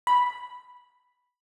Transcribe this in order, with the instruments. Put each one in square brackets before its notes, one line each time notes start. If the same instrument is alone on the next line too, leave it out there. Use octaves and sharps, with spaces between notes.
[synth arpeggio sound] B5